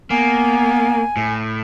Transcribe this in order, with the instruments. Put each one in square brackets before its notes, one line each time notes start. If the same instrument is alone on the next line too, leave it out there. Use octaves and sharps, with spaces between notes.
[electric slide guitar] A#3 [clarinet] B3 [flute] G#5
[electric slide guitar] A2